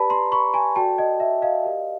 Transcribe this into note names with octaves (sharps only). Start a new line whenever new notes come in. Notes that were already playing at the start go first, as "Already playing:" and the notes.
Already playing: G4 B4 D5 A5 B5
A#5 C6
B5 C#6
G#5 A#5
F#4 A4 D5 G5 A5
D#5
E5
D#5 F5
G4 A#4 D5